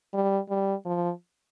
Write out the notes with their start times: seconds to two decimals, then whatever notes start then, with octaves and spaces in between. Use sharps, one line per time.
0.14 G3
0.49 G3
0.86 F3